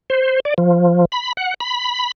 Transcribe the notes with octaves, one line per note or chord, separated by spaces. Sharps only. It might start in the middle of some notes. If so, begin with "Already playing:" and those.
C5
D5
F3
B5
F#5
B5